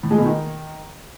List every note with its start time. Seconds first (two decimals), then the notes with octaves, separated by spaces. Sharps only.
0.03 A2
0.11 G#3
0.18 B2
0.26 D#3